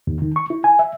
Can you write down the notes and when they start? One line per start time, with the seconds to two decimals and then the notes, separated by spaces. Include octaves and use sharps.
0.07 D#2
0.22 D#3
0.36 C#6
0.50 E4
0.64 G#5
0.79 E5